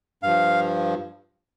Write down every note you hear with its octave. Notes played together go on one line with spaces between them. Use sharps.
G2 F3 F5